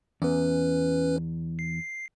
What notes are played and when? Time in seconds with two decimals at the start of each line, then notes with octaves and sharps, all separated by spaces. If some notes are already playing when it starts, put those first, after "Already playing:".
0.22 E2 C#4 B4
1.59 C7